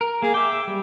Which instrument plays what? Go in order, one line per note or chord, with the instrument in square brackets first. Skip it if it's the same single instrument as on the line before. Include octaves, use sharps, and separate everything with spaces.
[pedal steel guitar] A#4
[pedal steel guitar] A#3 [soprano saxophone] G#4
[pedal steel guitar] E5 G5 [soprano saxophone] D6
[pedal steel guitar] G3